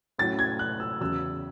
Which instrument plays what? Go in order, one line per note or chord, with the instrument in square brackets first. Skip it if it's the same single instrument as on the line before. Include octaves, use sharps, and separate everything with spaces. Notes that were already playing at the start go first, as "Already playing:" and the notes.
[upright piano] A2 F#3 C#4 E4 A6
G#6
F#6
E6
E2 C#3 F#3 E6